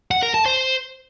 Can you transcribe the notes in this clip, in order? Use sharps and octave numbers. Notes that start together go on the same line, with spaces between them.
F#5
A#4
A5
C5